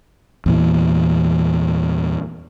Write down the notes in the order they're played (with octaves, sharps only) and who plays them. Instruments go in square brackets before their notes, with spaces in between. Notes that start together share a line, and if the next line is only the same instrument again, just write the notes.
[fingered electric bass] E2 A#2 E3